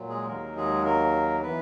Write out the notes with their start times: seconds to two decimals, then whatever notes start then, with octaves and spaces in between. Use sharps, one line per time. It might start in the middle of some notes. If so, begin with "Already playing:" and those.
Already playing: A#2 F#3
0.09 G#3 G#4
0.28 D#2 D#3 F#3 A#3 A#4
0.57 G#3 G#4
0.85 A#3 A#4
1.42 E3 B3 B4